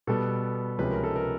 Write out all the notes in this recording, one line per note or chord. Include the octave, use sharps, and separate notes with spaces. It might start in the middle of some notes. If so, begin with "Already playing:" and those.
B2 G3 B3 A4
C#2 C3 F3 G#3 C#4 B4
A#4
A4
A#4